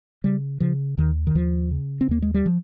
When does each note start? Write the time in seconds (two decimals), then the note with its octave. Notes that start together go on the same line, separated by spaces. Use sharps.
0.24 C#3 G3
0.60 C#3 F3
0.98 D#2 D#3
1.27 D#3
1.35 D#2 F3
1.71 C#3
2.01 C4
2.09 D#2 A#3
2.22 G#3
2.34 G3
2.46 F3